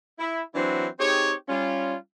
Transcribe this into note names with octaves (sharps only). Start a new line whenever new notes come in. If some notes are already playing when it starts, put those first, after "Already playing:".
E4
E3 F#3 C4 D4 E4 F#4
C4 D#4 G4 G#4 C#5
G3 C#4 F4